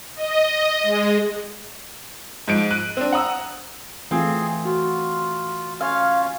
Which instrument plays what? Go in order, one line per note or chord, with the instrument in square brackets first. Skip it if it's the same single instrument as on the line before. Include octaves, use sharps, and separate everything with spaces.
[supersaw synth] D#5
G#3
[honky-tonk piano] G#2 F3 D7
F#6 D#7
C4 D4
F#5 A#5 D#6 E6
[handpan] E3 A3 F4 [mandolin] C4 [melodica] G#4
[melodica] F4 [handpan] F#4
[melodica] C#4 F4 C#5 [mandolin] F5